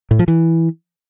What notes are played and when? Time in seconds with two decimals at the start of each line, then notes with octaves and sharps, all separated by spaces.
0.11 A2
0.19 F3
0.28 E3